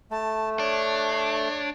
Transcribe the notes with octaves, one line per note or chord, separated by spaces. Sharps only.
A3 A5
D4 C#5